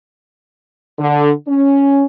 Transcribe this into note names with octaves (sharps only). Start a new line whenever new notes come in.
D3
C#4